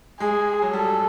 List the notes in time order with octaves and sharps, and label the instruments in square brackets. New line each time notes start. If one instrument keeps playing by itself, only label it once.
[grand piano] G#3 [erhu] G#4
[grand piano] F#3
[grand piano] G3 [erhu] A4